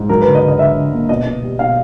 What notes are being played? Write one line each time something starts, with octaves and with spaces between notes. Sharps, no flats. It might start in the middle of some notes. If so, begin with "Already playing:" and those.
Already playing: G#2
F#3 A#4
D3 B4
D#5
D3
D#5
D3 E5
D3
A#3
B2 D#5
B2
G3
B2 F5